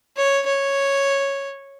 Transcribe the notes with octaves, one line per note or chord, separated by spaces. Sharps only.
C#5
C#5